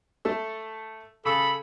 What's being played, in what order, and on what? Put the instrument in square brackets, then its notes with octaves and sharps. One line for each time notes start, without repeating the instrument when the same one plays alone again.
[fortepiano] A3 A4 E6
[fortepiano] C#3 [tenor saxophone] A4 [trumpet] B5